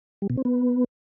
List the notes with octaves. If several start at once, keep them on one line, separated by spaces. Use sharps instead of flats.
G3
B2
C4
B3